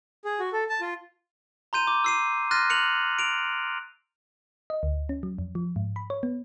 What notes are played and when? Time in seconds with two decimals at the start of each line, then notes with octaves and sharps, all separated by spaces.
0.25 G#4
0.40 F#4
0.53 A4
0.69 A5
0.81 F4
1.73 A#5 C6 G6 D#7
1.87 D6
2.04 E6 C7 D#7
2.51 C6 F6 F#6 A6 A#6 D#7
2.70 F#6 C#7 F7 F#7
3.19 D7 F7
4.70 D#5
4.83 D2
5.09 C#4
5.23 F#3
5.38 F2
5.55 F3
5.76 G#2
5.96 B5
6.10 C#5
6.23 B3